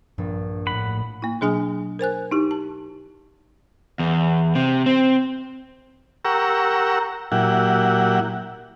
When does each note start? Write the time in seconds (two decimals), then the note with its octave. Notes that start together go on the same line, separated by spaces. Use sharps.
0.18 A#1 G2
0.67 A2 F#5 B5
1.22 A#3 E4
1.41 B2 F#3 D4 G#4 G#5 D#6
1.99 A#4 C5 G#5 F#6
2.31 D#4 E4 G4
2.51 A5
3.99 E2
4.55 C3
4.86 C4
6.25 G4 A#4 F#5 A#5 C#6 E6
7.32 A#2 F#3 E4 G4 F#5